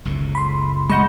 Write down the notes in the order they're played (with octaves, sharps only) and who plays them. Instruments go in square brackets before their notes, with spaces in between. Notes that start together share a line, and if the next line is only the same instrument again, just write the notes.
[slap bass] F#1 C#2 A2
[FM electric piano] B5 C6
[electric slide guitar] G#3 D#5 F#5 [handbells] B5 [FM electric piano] C#6 G6